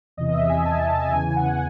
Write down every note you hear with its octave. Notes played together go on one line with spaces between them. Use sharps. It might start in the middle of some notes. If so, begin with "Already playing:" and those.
E2 C3 E3 D#5
E5
G#5
A5
A5
G#5
E2 C#3 E3 G#5
F#5